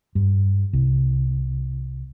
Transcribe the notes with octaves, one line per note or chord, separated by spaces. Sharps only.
G2
C2